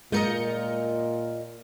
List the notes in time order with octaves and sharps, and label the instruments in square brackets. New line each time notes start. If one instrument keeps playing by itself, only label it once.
[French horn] A#2 [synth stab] G#3 G6 C#7 [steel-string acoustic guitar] F4 A#4 D#5